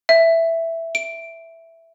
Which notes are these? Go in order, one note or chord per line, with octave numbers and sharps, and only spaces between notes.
E5
D7